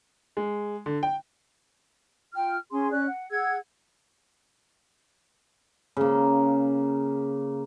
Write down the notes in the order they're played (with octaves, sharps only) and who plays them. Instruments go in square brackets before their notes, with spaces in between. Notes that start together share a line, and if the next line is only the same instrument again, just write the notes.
[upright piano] G#3
D3
G5
[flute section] F4 G5 F6
C#4 G#4 G#5 C6
C#4 D5 F#6
F#5
G#4 F#5 E6 G#6
[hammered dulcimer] C#3 A#3